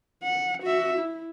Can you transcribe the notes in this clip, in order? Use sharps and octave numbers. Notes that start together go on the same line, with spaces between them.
F#5
F#4 E5
E4